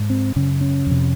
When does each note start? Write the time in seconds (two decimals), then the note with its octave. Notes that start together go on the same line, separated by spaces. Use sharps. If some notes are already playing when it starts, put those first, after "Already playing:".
Already playing: G#2
0.10 C4
0.36 F#2 C#3 C#4
0.61 C#4
0.87 F2 C3